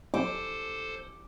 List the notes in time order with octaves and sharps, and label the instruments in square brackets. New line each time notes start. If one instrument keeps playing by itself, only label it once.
[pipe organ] A4 C5 [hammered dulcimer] D6